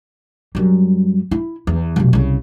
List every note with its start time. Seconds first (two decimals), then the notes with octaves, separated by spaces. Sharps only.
0.55 F#2 G3
1.31 E4
1.67 E2
1.96 F1 B1
2.13 C2 C#3